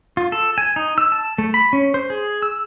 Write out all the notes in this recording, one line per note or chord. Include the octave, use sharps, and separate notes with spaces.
F4
A4
G#5
D#4
E6
A5
A3
B5
C#4
C5
G#4
E6